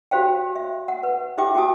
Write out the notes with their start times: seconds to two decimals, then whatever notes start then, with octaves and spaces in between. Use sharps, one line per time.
0.11 F#4 G4 C5 F5 G5
0.56 E5
0.88 F#5
1.03 B4
1.38 E4 G4 E5 G5 D6
1.55 F#4 G4 G5 A5 D#6